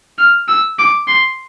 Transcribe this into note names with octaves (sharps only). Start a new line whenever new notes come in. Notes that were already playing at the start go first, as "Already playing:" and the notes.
F6
E6
D6
C6